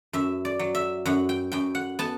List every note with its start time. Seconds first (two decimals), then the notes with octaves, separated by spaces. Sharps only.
0.13 F#2 E5
0.45 D5
0.59 F#3
0.75 E5
1.06 F#2 F#5
1.29 G5
1.52 F#2 G5
1.75 F#5
1.99 B3 A5